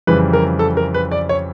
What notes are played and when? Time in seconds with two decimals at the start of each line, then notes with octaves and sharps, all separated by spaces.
0.07 F2 C#3 E3 G3 B4
0.33 A#4
0.59 A4
0.77 A#4
0.94 B4
1.11 D5
1.29 C#5